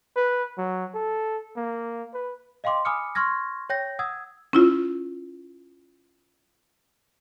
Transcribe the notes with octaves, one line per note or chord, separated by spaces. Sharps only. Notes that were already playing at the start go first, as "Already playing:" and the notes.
B4
F#3
A4
A#3
B4
D#5 F5 G5 C6 D6
G#5 B5 D6 D#6 F6 C#7
C6 C#6 F6 G#6 A#6
C#5 G5 G6 A#6
F#5 D#6 E6 G#6
C#4 E4 F4